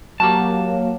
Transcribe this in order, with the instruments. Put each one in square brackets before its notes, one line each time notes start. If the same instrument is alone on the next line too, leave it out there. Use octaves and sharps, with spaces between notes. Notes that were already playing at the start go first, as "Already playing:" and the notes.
[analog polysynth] F#3 A#3 [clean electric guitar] G4 A5